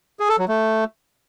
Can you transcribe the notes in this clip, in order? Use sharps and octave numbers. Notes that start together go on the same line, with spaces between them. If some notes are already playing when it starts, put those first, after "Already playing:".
G#4
A4
F#3
A3